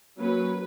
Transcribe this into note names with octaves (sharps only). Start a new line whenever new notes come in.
F#3 A#3 C#4 B4